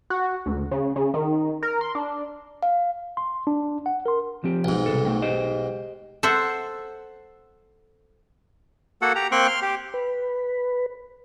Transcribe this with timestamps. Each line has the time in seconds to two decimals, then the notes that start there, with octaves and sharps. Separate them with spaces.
0.10 F#4
0.46 D2
0.71 C#3
0.96 C#3
1.14 D#3
1.63 A#4
1.81 C6
1.95 D4
2.63 F5
3.17 C6
3.47 D4
3.86 F#5
4.06 A#4 C6
4.44 F3 C4 G4
4.64 B1 G#2
4.86 C2 C3 A4
5.05 A3 D#4 G5
5.22 G4 C5 D#5
6.23 A4 C5 E5 F#5
9.02 A#3 F#4 A4 F#5
9.15 G4 A#5
9.32 A#3 C4 G5 C6 C#6 F#6
9.47 C6 F6
9.62 G4
9.94 B4